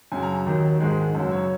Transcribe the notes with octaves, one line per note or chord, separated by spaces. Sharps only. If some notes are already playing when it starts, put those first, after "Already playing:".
F#2 C#3 F#3 G#5
A#5
D#2 D#3 F#3
G#2 D#3 G#3
F#2 C#3 F#3
C#5